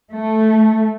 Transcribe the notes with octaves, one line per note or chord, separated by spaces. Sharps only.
A3